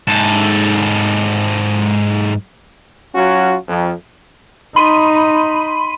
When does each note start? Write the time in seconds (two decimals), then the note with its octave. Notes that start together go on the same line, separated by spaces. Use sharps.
0.08 G#2 A4
3.15 F#3 C#4 F4 F#4
3.68 F2
4.76 D#4 B5 C6 D#7